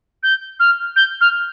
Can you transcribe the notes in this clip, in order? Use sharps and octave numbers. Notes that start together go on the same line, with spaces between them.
G6
F6
G6
F6